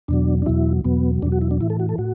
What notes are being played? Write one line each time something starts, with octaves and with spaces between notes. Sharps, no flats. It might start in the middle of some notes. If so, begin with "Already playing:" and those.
E2 B2 F#3 D4
D4
E2 B2 F#3 E4
E2 B2 F#3 B3
E2 B2 F#3 D4
F#4
E4
D4
A2 E3 E4
A4
F#4
A4
A2 F#4